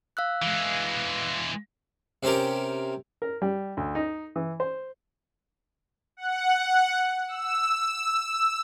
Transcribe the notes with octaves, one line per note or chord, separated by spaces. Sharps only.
F5 E6 F#6
E3 G#3
C3 C4 C#4 G4 A#4
A#4
G3
D2
D#4
E3
C5
F#5
E6